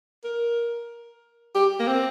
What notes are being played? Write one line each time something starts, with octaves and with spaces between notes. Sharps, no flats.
A#4
G4
A#3
C4